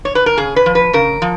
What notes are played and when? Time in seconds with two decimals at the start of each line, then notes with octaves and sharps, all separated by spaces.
0.05 C#5
0.15 B4
0.26 A#4
0.37 C#3 G#4
0.56 B4
0.66 F3
0.75 B4
0.93 C#3 A#4
1.22 F3